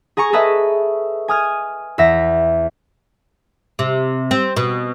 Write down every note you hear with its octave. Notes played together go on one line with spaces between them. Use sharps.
G#4 G#5 A#5 C#6
G#4 A4 B4 D#5 E5
G#5 D#6 F6 G#6
E2 E5 A#6
C3
C4
B2